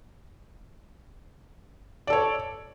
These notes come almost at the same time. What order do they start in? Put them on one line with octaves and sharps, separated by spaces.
D5 A4 C#5